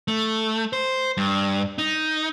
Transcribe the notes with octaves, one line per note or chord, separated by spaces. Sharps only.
A3
C5
G2
D#4